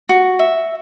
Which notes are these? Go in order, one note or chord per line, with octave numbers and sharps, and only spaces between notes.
F#4
E5